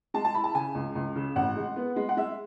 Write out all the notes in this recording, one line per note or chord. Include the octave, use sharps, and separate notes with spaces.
G#3 A5
A5
E4 B5
A5
C#3 G#5
C#2
C#2
C#3
A1 F#5
G#3
B3
G#3
F#5
G#3 E5